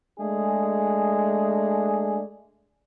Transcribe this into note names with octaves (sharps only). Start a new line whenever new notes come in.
G#3 A3 D4 G#4